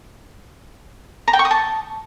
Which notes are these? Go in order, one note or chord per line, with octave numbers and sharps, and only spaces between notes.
A#5
G5
C#6
D#6
A5